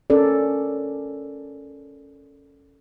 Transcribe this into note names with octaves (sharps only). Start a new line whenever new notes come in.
C#4 A4 A#4 D5